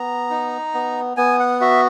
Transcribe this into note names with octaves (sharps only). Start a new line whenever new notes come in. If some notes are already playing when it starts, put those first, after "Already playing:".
Already playing: B3 A#5
D#4
B3
B3 G#5
F#5
F#4 E5